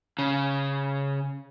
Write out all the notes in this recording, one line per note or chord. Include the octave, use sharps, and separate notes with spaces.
C#3